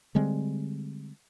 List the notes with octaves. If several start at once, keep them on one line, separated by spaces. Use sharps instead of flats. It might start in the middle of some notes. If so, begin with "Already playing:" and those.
D3 G3 G#3 C4